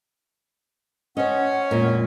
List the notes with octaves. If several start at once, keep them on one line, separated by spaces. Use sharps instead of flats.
C#4 C5 D#5 F#5
F2 A#2 G#3